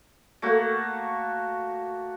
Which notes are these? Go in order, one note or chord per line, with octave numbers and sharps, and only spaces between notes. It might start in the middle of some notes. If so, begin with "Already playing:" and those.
A3 A#3 F#4